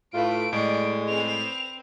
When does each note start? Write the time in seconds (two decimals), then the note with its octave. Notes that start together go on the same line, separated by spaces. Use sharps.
0.14 A2 A3 F4 B4 D7
0.53 A2 G#3 D5
1.09 C4 B4 F7